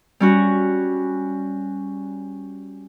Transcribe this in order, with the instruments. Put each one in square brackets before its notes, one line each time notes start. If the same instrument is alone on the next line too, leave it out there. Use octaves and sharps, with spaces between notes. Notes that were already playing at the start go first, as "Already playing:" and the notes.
[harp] G3 C#4 F#4